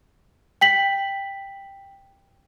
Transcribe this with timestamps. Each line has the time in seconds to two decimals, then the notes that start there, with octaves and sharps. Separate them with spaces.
0.61 G5 B6 F#7